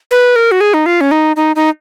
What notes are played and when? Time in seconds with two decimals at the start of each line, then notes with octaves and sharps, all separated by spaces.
0.11 B4
0.36 A#4
0.51 F#4
0.61 G#4
0.74 D#4
0.86 F4
1.01 C#4
1.11 D#4
1.36 D#4
1.56 D#4